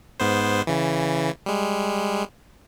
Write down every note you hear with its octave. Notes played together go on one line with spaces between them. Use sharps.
G#2 B3 C5
C#3 E3
G3 G#3